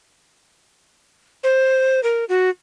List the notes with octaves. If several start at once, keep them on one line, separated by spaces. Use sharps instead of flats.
C5
A#4
F#4